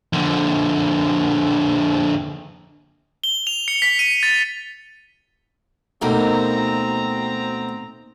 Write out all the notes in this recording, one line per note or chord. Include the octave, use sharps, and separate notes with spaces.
F2 D3
G7
F7
C#7
B6
D#7
A6
D2 B2 A#3 C4 D#4 G5 A#5